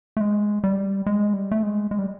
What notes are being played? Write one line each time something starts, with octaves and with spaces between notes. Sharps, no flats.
A3
G#3
G3
G#3
G3
A3
G#3
G#3
G3